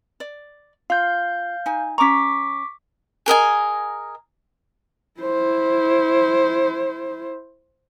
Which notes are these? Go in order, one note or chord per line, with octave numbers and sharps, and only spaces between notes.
D5
F4 F5 G6
D#4 G#5
C#4 A#5 C#6 D6 B6
G#4 A#4 D#5 G#5
E4 C5